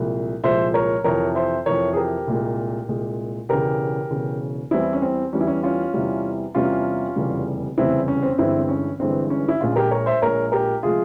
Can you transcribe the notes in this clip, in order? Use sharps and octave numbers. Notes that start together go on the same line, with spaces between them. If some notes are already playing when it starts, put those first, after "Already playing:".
Already playing: C2 A#2 F3 G#3
C2 A#2 F3 G#3 C5 E5
A#4 C#5
F2 C3 E3 A#4 C#5
C5 E5
F2 C3 E3 A#4 C#5
G#4
G4 A#4
C2 A#2 G#3
C2 A#2 G#3
E1 E2 C#3 G4 A#4
E1 E2 C#3
E2 E3 G3 C4 E4
C#4
C4
E2 E3 G3 C#4
E4
C#4
C#4 F4
E2 C3 E3 G3
E2 C3 E3 G3 C#4 F4
F1 E2 C#3 G3
F1 E2 C#3 G3 C4 E4
C#4
C4
C#4
G1 G2 E3 G#3 C4 E4
C4
C#4
G1 G2 E3 G#3 C4
C#4
E4
A#1 A#2 G#3 C#4 F4
G4 A#4
A#4 C#5
C5 E5
A#1 A#2 G#3 A#4 C#5
G4 A#4
C3 F3 G#3 F4 G#4